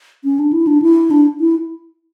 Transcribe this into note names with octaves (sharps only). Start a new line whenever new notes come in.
C#4
D4
E4
D4
E4
D4
E4